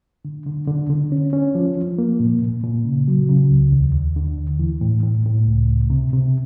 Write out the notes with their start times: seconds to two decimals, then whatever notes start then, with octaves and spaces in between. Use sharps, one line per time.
0.25 D3
0.46 D3
0.68 D3
0.90 D3
1.12 C#4
1.33 C#4
1.55 F3
1.77 F3
1.98 A#3
2.20 A#2
2.42 A#2
2.64 A#2
2.85 C#3
3.08 F#3
3.29 C#3
3.51 C#2
3.72 D#2
3.95 D#2
4.16 D3
4.38 D#2
4.59 E3
4.81 A2
5.03 A2
5.26 A2
5.46 C#2
5.69 C#2
5.90 C3
6.13 C3